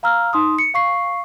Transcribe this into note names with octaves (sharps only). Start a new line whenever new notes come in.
F5 A#5 E6 F6
D#4 C6 D#6
C#7
F5 C#6 C7